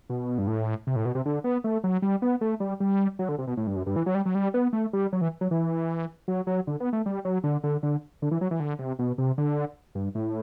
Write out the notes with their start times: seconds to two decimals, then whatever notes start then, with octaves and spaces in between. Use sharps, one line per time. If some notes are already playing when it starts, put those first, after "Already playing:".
0.10 B2
0.38 G2
0.47 A2
0.87 C3
0.96 A2
1.05 B2
1.15 C3
1.26 D3
1.44 B3
1.64 A3
1.84 F#3
2.02 G3
2.22 B3
2.41 A3
2.60 G3
2.80 G3
3.19 F#3
3.29 D3
3.38 C3
3.47 B2
3.57 A2
3.67 G2
3.76 F#2
3.86 G2
3.96 E3
4.06 F#3
4.15 G3
4.26 F#3
4.35 G3
4.54 B3
4.73 A3
4.93 G3
5.13 F#3
5.21 E3
5.41 F#3
5.51 E3
6.28 F#3
6.47 F#3
6.67 D3
6.80 B3
6.93 A3
7.06 G3
7.25 F#3
7.44 D3
7.64 D3
7.83 D3
8.22 D3
8.31 E3
8.41 F#3
8.51 E3
8.60 D3
8.79 C3
8.99 B2
9.18 C3
9.38 D3
9.95 G2
10.15 A2